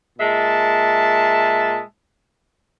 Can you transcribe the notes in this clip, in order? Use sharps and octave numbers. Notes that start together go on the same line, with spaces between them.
A#2 G#3 E5 A5